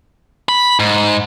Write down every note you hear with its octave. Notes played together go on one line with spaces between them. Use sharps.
B5
G#2